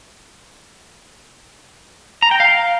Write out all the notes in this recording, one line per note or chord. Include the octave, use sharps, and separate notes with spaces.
A#5
G5
F5